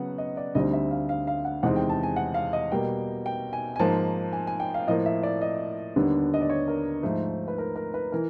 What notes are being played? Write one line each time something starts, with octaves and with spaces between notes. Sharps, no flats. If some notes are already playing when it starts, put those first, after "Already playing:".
Already playing: C#3 F#3 B3 F#5
D#5
D5
D2 D3 G3 C4 D#4 D#5
E5
F5
F5
F5
F#5
E2 C3 D#3 G#3 C4 F#5
G5
A5
G#5
F#5
F5
D#5
B2 G3 A#3 G5
G5
G#5
G#5
G#2 F3 A#3 A5
G#5
G#5
G5
F5
A2 F3 A#3 D#5
E5
D5
D#5
D#2 D3 G3 B3 D4
D#5
D5
C#5
A#4
G#2 F3 A3 C5
B4
A#4
A#4
B4
E3 A#4